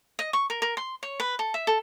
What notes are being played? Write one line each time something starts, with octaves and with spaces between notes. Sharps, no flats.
D#5
C#6
A#4
A#4
C6
C#5
B4
A4
E5
A4